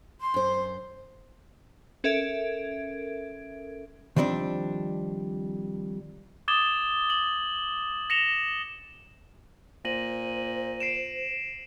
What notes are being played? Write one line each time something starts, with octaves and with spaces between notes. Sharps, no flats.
C6
F#2 C5
C#4 A4 A#4 E5 G#6 D7
D#3 F3 G3 C4 D4
D6 D#6 G#6 A6 E7 G7
F#7
A#6 C#7 E7 F7 G7
A#2 C5 A#6 D#7 F#7
C7 D7 E7